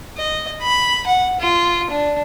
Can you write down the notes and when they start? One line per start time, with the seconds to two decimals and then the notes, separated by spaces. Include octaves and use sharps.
0.17 D#5
0.62 B5
1.07 F#5
1.40 F4
1.90 D4